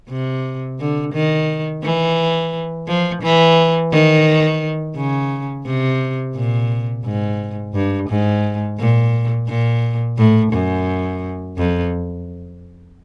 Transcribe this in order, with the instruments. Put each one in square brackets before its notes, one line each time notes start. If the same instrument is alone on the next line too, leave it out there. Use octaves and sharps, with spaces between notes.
[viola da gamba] C3
D3
D#3
E3
F3
E3
D#3
C#3
C3
A#2
G#2
G2
G#2
A#2
A#2
A2
F#2
F2